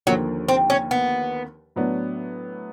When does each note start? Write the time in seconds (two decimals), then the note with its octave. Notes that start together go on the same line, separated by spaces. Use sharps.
0.07 D#2 D3 F3 F#3 A#3
0.48 C4
0.70 C#4
0.91 B3
1.76 A2 F#3 B3 D4